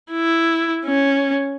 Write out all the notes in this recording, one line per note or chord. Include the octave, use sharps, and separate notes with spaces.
E4
C#4